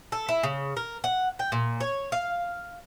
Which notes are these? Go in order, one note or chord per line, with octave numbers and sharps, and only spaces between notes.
A4
E4
C#3
A#4
F#5
G5
A#2
C#5
F5